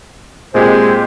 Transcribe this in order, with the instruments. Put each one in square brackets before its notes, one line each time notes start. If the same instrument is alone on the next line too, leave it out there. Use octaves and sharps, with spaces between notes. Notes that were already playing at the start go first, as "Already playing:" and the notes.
[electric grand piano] A#2 C4 G4 [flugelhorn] G#3 [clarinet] C5